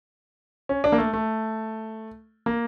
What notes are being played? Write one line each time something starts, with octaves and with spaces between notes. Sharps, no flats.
C#4
D4
A#3
A3
A3
A#3